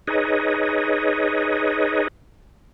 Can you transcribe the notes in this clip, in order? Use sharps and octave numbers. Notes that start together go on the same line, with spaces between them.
D#4 G#4 B4 C#5 D#5